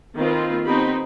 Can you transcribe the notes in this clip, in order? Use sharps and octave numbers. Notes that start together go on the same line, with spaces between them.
D#3 A#3 C4 F4 A4 B4
B3 C4 D#4 G4 B5